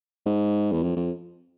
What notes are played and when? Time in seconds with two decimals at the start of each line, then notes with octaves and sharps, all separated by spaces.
0.26 G#2
0.72 E2
0.82 F2
0.97 F2